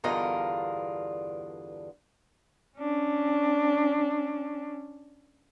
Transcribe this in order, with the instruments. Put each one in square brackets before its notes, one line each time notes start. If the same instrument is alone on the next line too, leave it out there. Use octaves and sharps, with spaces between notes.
[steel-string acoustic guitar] E2 G2 D3 F4 A#4 D#5
[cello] C#4 D4